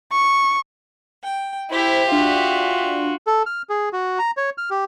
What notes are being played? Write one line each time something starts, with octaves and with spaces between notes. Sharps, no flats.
C#6
G5
E4 G4 C5 E5
D4 F4 F#4
A4
F6
G#4
F#4
A#5
C#5
F6
G4